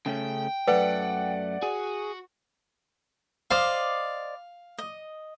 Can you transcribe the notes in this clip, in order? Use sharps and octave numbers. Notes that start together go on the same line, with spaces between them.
C#3 A3 C#4 G5
F#2 A3 B4 D5 F#5
F#4 G#4
C5 D5 D#5 F5
D#5